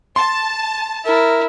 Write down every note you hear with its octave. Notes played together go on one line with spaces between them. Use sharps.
A5 C6
E4 A#4